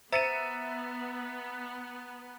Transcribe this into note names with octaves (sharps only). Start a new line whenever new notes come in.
B3 C5 E5 A#5 A6 C#7 D#7